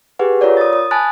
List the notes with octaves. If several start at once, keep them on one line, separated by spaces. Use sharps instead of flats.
G4 G#4 B4 F#5
F4 A#4 C#5 D5
D#6 A6
D#6
G#5 A5 B5 F#6 A6